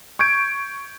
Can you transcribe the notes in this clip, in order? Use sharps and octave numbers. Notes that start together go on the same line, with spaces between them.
C#6 G6 G#6 D7